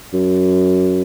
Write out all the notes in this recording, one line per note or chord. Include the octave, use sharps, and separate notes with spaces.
F#2